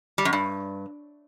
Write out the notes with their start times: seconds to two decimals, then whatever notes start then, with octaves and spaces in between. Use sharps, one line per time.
0.18 G3
0.25 F#2
0.33 G2